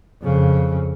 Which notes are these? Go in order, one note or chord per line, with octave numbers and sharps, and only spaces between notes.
F2 C#3